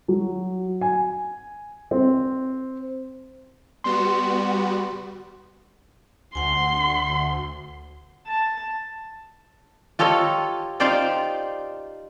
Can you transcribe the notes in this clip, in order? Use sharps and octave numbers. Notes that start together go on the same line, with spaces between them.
F#3
G#5
C4
G3 B3 F#4 C6
D2 F#5 G#5 C6
A5
F4 G4 A4 C#5 D#5
D#4 F4 G4 C5 D5 F5